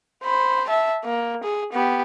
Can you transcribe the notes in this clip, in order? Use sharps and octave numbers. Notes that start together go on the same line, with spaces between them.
C5 B5
E5 A5
A#3
G#4
B3 G4